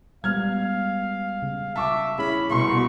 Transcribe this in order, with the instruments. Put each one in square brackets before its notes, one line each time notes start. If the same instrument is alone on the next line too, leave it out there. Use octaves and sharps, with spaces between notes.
[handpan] G3 G#3 B3 [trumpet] F5 [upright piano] F6 G#6
[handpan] C#3
[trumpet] E5 [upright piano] A5 C#6 D6
[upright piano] C#4 [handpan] E4 G#4 [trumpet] B5
[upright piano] C2 C6 [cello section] B2 [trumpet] C#6